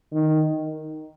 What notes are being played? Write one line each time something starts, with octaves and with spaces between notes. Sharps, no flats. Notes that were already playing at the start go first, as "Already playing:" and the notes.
D#3